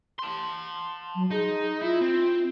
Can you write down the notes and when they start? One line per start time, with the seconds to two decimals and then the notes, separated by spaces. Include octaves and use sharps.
0.19 A5 C6
1.15 F#3
1.31 D#4 G#4
1.82 E4 F4
2.01 C4